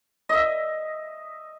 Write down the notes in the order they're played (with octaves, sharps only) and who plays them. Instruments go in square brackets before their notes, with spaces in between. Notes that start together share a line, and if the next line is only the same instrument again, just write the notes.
[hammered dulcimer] D#5 E5